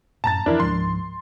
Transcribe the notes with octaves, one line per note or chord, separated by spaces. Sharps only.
F#2 A2 A5 A#5 A6
F2 E3 D4 E4 A#4
C#2 G#2 F3 C6